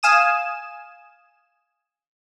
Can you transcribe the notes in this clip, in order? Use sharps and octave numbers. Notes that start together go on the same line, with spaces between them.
F5 G#5 D#6 E7